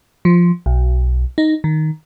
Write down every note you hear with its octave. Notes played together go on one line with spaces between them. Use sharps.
F3
B1
D#4
D#3